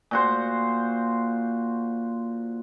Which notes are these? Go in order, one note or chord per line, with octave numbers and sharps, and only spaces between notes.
A#2 F#4 C5